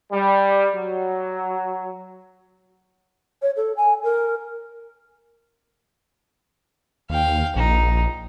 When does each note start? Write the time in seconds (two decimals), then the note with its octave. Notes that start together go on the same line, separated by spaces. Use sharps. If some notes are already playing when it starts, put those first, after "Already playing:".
0.12 G3
0.74 F#3
3.42 C#5
3.57 A4
3.77 G#5
4.03 A#4
7.10 D#2 F5 G5
7.56 A#1 D#4